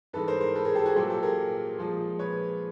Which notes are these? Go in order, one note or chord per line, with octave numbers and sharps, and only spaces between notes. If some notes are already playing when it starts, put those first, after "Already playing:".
G#2 E3 G#3 A4 B4
A#4 C5
A#4 C5
A4 B4
G#4 A#4
G4 A4
F#4 G#4
A#2 F#3 G4 A4
G4 A4
G#4 A#4
A#2 F3 G#3
B4 C#5